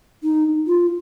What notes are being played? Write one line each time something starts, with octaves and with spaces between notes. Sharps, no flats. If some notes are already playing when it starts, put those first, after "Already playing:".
D#4
F4